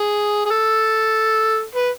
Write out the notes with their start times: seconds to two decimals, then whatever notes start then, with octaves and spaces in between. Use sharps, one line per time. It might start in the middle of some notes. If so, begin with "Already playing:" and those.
Already playing: G#4
0.46 G#4
0.50 A4
1.75 B4